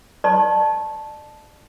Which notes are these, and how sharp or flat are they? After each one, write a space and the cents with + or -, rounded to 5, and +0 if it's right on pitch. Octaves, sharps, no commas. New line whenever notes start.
D5 +40 A5 -10 C#6 -40